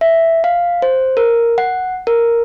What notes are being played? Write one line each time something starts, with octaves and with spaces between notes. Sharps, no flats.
E5
F5
C5
A#4
F#5
A#4